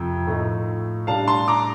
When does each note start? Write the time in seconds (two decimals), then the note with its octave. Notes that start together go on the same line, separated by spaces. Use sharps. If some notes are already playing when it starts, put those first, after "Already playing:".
Already playing: F2 C3
0.27 A2 F3 A3 D#4
1.07 A2 G3 D4 F5 A5
1.28 A5 C6
1.48 A#5 D6